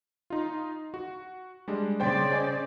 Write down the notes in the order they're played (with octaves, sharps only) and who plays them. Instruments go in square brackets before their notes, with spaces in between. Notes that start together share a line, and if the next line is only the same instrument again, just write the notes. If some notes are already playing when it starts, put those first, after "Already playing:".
[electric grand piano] D#4 F4
F#4
G3 G#3 D4
[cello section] C#3 D5 [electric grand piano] C5 G5 C6
[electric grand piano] C5 D#5 G#5